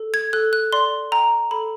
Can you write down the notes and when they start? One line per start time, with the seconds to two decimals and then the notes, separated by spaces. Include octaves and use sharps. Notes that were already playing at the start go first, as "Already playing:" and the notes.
Already playing: A4
0.14 G#6
0.33 A4 F#6
0.53 F#6
0.73 D5 C6
1.12 G5 A#5
1.51 A4 B5